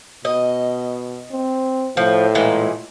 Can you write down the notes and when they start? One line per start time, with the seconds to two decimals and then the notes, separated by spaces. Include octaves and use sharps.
0.25 B2 D#5
1.32 C4
1.97 A2 F3
2.35 A#2 E3 G#3